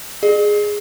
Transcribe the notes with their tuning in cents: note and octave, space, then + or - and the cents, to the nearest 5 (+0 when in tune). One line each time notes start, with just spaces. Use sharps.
G#4 +0 D#5 -45